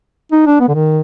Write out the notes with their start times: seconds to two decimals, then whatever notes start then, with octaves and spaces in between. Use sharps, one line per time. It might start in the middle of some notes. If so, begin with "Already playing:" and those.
0.32 D#4
0.47 D4
0.60 B3
0.68 D3
0.74 D#3